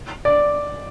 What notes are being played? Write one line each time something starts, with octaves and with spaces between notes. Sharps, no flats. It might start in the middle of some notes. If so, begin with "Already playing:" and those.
D5